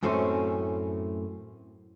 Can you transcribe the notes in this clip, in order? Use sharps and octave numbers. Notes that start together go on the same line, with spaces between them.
F#2 A2 A3 C4 C#4